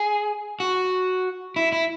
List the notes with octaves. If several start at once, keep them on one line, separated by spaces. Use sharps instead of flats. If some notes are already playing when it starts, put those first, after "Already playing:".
Already playing: G#4
F#4
E4
E4